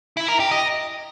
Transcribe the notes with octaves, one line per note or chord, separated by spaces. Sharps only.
E4
A#4
G4
D#5